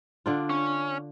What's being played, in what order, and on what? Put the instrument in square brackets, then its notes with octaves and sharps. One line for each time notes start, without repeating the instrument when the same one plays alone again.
[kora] D3 D4 F4
[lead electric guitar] C#4